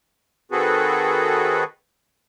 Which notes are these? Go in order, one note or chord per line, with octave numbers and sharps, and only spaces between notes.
D#3 C4 F#4 G#4 A4 B4